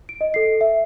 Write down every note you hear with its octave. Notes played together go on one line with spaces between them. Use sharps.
D7
D#5
A4 C7
E5